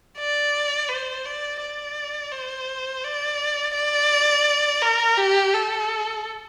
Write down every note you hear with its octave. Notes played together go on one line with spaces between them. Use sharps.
D5
C5
D5
D5
C5
D5
D5
A#4
G4
A4